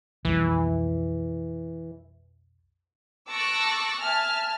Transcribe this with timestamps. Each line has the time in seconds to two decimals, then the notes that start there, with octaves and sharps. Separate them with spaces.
0.25 B1 F2 E3 G3
3.29 A5 C#6 D6 E6 F#6 A#6
4.00 E5 G#5 A5 F6